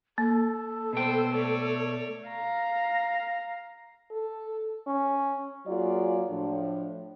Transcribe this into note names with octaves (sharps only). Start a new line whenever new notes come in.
A#3 A4
B2 G3 B3 C5 G5
A3 C#5 D5
F5 A#5
A4
C#4
F#3 A#3 F4 F#4 G#4 D5
A2 F3 D4